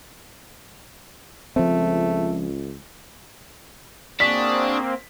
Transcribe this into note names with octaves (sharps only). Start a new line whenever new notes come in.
C#2 F3 A3 C4
A#3 C4 D4 F#4 G#4 D#6 B6